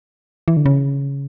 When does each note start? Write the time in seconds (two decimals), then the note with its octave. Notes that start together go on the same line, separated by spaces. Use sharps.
0.48 E3
0.57 D3
0.66 C#3